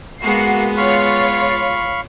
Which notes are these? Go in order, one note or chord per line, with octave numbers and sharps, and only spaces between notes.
G#3 A#3 B3 F#4 C7
F4 C#5 F5 B5 C#6